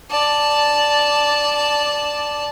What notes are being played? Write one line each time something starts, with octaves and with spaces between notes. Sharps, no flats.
D5 A5